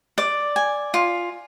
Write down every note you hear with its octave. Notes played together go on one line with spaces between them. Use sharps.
D5
G#5
F4